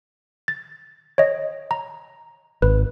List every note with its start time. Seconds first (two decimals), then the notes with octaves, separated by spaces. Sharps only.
0.48 A6
1.18 C#5 D#5
1.71 A#5
2.62 G#1 B4